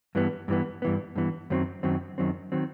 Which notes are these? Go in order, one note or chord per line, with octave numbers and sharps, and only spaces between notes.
G2 E3 B3
G2 E3 B3
G2 E3 B3
G2 E3 B3
F#2 D#3 F#3 C4
F#2 D#3 F#3 C4
F#2 D#3 F#3 C4
D#3 F#3 C4